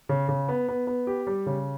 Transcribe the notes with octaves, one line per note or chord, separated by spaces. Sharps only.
C#3
C#3
B3
B3
B3
G4
G3
C#3